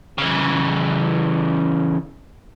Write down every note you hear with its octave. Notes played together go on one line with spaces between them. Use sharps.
C#3 E3